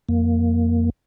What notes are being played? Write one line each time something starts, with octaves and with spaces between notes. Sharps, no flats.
F2 A#3